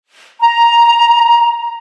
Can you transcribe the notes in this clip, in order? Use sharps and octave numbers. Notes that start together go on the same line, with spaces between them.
A#5